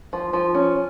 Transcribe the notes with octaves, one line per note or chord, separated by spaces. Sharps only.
F3
F3
C#4